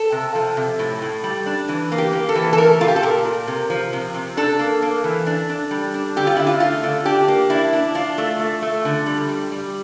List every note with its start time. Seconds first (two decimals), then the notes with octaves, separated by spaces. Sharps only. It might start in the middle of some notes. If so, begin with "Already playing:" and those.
Already playing: A4
0.12 C3
0.35 F3
0.57 C3
0.79 A2
1.02 A2
1.24 G3
1.46 D4
1.69 E3
1.92 A#3
1.98 G4
2.13 A#3
2.29 A4
2.35 E3
2.53 A4
2.58 A3 A#4
2.80 A#2 F4
2.88 G4
2.96 A4
3.02 A#2 A#4
3.25 A#2
3.47 C3
3.70 F3
3.93 C3
4.14 C3
4.37 D4 A4
4.59 A#3
4.82 A#3
5.04 E3
5.26 D4
5.49 D4
5.71 G3
5.94 D4
6.16 D3 G4
6.27 F4
6.37 D3 E4
6.47 F4
6.60 A3 F4
6.83 D3
7.05 D4 G4
7.28 A#3
7.50 D4 E4
7.73 D4
7.95 D4 F4
8.18 A3
8.39 A3
8.62 A3
8.85 D3
9.06 G3
9.29 G3
9.52 G3